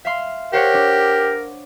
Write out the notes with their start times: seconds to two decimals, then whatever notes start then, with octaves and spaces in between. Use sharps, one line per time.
0.05 E5 F5 C6
0.53 G4 A#4 C5 C#5 F#5
0.74 D4